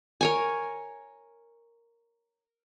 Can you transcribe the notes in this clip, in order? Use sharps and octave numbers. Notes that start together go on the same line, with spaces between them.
A#4 C#5 G#5